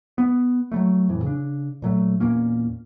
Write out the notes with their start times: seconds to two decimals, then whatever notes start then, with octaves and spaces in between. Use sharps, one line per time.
0.18 B3
0.72 F#3 G3 A3
1.08 F2 A2 E3
1.23 C#3 D4
1.82 A#2 F#3 A3
2.20 E2 A#2 A#3 C#4